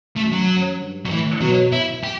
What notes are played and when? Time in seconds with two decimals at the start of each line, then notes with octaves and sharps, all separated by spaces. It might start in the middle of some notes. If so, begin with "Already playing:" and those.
0.16 F#2 A3
0.32 F#3
0.48 F#2
0.79 G2
1.05 F#3
1.10 A2 E3
1.41 B2 F#3
1.72 E4
2.04 G4